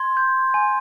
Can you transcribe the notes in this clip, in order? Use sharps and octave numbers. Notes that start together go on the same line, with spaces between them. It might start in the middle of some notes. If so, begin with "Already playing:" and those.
Already playing: C6 G#6
G6
G#5